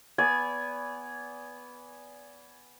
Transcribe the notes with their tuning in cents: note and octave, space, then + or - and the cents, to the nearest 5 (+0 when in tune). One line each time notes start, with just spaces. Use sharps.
B3 +0 D5 -30 G#5 +0